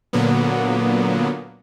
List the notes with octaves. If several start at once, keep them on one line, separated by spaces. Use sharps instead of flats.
A#2 D3 F#3 A#3 B3